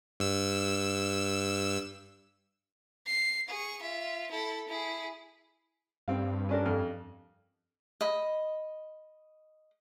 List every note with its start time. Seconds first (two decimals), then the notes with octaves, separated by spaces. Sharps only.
0.20 G2 E6
3.07 C7
3.48 G#4 C#6
3.82 F4 E5
4.31 E4 A4
4.68 E4 G#4
6.08 G2 C4 F5
6.49 C#4 D4 A#4
6.66 F2 F6
8.01 D#5 B5